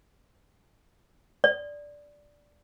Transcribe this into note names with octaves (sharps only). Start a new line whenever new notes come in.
D5